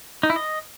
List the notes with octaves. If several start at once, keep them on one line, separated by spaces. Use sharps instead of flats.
D#4
E4
D#5